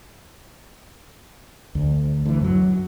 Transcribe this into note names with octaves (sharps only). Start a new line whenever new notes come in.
D2
D2 E3
F#2 F3 F#3